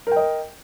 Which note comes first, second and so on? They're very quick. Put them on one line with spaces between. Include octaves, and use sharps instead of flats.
A#4 G5 D#5